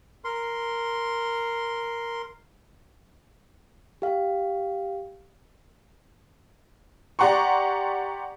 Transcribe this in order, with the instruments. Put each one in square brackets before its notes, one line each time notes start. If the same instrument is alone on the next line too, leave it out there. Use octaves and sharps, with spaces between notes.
[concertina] A#4 C6
[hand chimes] G4 F5
[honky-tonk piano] G4 D5 F#5 A#5 C6 C#6